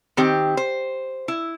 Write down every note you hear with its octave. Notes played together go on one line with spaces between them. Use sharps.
D#3 C4 G4
C5
E4